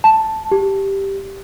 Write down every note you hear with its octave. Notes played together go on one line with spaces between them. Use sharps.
A5
G4